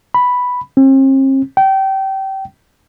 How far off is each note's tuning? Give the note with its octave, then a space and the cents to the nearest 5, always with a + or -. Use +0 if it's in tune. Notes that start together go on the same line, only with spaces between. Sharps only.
B5 +0
C4 +45
G5 -25